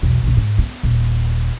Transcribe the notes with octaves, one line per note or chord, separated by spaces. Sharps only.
B1 E2
B1 B2
G#2
B3
D#1